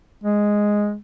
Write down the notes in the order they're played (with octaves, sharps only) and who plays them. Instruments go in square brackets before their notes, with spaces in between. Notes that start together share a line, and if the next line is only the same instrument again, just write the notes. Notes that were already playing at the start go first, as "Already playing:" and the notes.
[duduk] G#3